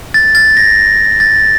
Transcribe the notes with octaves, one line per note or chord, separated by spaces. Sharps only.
A6
A6
A#6
A6